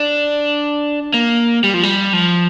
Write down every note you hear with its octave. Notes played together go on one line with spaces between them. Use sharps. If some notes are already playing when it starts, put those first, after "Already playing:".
Already playing: D4
A#3
G3
F3
G3
F3